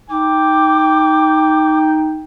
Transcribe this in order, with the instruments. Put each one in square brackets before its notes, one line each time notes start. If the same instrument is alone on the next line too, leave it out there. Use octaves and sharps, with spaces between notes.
[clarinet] D#4 [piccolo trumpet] G5 [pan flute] D6